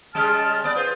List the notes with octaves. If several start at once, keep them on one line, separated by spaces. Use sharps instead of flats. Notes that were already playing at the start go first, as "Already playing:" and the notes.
C#3 G3 G#3 A5 F6
B3 D5
F4 G#4 B4 C5